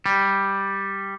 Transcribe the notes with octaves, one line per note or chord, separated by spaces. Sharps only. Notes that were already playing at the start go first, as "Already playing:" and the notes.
G3